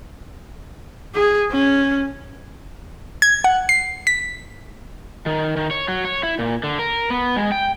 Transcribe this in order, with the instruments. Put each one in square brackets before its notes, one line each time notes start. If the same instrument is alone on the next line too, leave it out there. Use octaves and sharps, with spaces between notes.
[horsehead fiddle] G#4
C#4
[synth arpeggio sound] G#6
F#5
C7
B6
[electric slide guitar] D#3
D#3
C#5
F#3
C#5
E4
A#2
D3
A#4
B3
G#3
G5